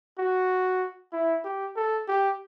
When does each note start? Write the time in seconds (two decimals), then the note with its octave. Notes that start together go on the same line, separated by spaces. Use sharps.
0.18 F#4
1.13 E4
1.44 G4
1.76 A4
2.08 G4